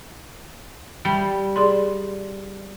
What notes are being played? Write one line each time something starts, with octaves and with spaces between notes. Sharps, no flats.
G3 G5
G#4 D5 C6